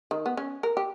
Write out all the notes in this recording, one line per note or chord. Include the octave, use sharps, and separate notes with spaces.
D#3
B3
C#4
A#4
G4